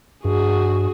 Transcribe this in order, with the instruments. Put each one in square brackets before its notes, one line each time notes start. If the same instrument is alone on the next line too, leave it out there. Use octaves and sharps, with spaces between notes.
[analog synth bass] G2 [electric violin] F#4 G#4